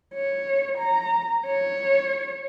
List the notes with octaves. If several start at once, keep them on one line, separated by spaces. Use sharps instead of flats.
C#5
A#5
C#5